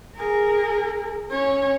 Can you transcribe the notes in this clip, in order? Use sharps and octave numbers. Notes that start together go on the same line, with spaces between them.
G#4 A#4
C#4 C#5